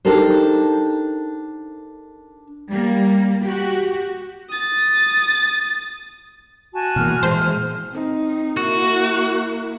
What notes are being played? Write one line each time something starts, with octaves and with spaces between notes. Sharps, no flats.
D4 D#4 G4 A4 A#4 C5
G3 A#3
F#4 G4
D#6 A6
F#4 G#5 A5
B2 E3 A#3 F6
A#2 E3 G#3 C5
C4 D#4
A#3 E4 F#4